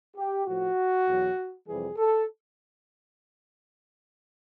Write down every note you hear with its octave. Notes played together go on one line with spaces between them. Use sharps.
G4
A2 F3 F#4
E2 B2 F#3
F2 C3 E3 G3 G#4
A4